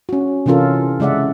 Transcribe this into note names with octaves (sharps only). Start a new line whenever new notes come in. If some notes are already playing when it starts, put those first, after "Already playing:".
C#4 F#4
C3 E3 C#4 F4 A4 A#4
C#3 G#3 D5 E5 F#5